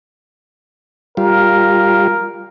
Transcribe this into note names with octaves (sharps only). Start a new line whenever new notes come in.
G3 F4 A#4